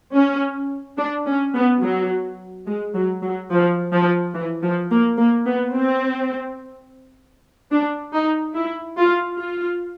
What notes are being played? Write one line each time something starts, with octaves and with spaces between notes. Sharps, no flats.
C#4
D4
C#4
B3
F#3
G#3
F#3
F#3
F3
F3
E3
F3
A#3
A#3
B3
C4
D4
D#4
E4
F4
F4